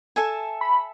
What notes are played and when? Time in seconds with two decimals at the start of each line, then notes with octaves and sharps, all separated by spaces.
0.16 A4 E5 G#5
0.61 B5